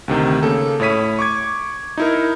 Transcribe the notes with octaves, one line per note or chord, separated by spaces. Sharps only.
D2 C3 D#3
C#3 A#3 A4
A2 E4 C#5 B6 D#7
C#6 D6 G#6
D#4 E4 A#4